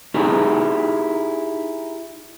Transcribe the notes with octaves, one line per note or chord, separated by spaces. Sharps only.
D#4 E4 G4 G#4